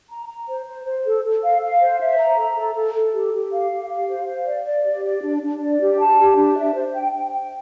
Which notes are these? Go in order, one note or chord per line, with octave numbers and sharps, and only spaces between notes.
A#5
A#5
C5
C5
C5
A4
A4
F5
F5
C5
E5
A#5
A4
A4
A4
A4
G4
G4
F5
G4
F5
C5
F5
D5
D5
G4
D5
D4
D4
D5
G4
A5
G4
D4
E5
C5
G5
G5
G5